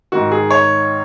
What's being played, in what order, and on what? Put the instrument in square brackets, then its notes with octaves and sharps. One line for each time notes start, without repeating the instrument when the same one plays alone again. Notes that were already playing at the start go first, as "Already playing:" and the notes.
[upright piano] G#2 D#3 F#4
G#4
C#5